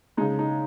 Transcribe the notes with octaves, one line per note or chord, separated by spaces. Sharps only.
C#3 G#3 D#4
D#4